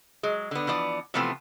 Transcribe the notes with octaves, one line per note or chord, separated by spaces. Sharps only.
F#3 G#3
D3 B3
E3 F3 B3 D5
C3 E3 F3 A3 B3 C4